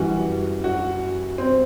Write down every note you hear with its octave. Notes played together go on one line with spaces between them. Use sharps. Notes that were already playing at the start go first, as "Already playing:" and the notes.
Already playing: F#2 E3 G3 F#4
F#4
C4